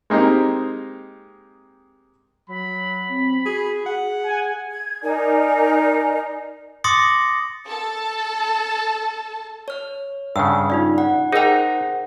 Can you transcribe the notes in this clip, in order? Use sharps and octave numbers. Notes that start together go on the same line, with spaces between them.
G#3 A#3 C4 D#4 G4
F#3 B5
C4
F#4 G#4
G#4 F#5
G#5
G#6
D#4 A#4 D5 G#5
C6 D6 D#6 A6 A#6 C#7
A4 A5
C#5 F6
G2 C#3 F#5 E6
D#4 F4 D5
F#5
D#4 G#4 A#4 C5 F#5 G5 A#5